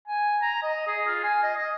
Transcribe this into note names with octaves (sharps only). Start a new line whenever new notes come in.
G#5
A#5
D#5
G#4
F4
G#5
D#5
D#5